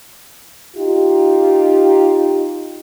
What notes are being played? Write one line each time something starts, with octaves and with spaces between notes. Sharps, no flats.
D#4 F4 G4